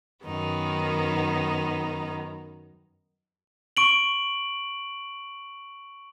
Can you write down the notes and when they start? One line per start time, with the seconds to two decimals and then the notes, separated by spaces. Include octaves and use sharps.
0.24 F#2 D#3 B3 D#4
3.77 C#6 D7 F#7